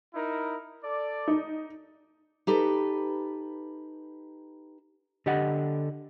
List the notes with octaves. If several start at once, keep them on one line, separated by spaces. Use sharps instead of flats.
D#4 E4 A#4
A4 D5
D#4
D#4 G4 A4 B4
D3 G4 D#5 F#5